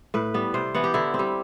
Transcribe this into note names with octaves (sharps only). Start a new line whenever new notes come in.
A2 B4
G3 B3
C3 C5
E3 B3 F#5
G4
D3 E4
C4
G3